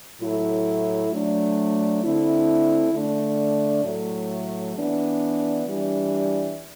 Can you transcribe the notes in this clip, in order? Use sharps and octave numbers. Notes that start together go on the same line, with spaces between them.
A2 F#3 A3 E4
F#3 A3 D4
D3 A3 C4 E4
D3 A3 D4
A2 F#3 A3
E3 B3 D4
E3 G3 D4